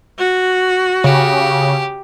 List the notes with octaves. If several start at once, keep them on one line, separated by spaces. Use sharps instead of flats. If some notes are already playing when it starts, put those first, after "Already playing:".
F#4
C#3 G4